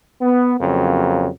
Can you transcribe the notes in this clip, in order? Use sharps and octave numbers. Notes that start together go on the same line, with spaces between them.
B3
F2 C#3 F#3 A#3